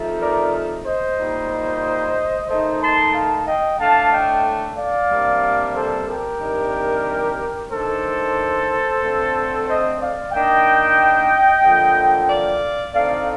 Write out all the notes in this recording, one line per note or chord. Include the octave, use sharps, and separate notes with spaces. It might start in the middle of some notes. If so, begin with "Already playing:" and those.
Already playing: C3 F3 A3 D#4
A#4 D5
C5 D#5
A#2 G3 A#3 D#4
D#3 A3 D#4 C5 D#5
A5 C6
F5 A5
D#5 G5
A2 A3 D4 F5 A5
D#5 G5
D5 F5
C3 G3 A#3 D4
A4 C5
G4 A#4
C3 D#3 G3 D4
D#3 A3 D4 A4 C5
D3 A3 C4
C5 D#5
D5 F5
D#3 A#3 D4 D#5 G5
D3 F3 A#3
D5 F5
D3 A3 C4 D#4 D5 F5